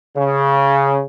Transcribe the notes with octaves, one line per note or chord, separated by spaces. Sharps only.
C#3